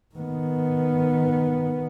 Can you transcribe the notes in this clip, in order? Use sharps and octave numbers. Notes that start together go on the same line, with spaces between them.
D#3 B3